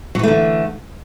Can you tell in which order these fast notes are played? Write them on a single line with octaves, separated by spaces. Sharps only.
F#3 E3 A3 D3